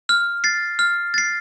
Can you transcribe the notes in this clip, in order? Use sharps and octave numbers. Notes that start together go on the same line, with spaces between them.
F6
A6 C7
F6
A6 C7